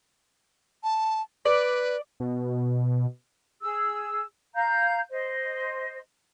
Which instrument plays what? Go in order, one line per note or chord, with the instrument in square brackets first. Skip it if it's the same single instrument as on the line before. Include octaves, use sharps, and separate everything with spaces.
[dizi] A5
[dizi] B4 [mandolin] D5
[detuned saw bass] B2
[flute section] G#4 E6
F5 A#5 G6
C5 D#5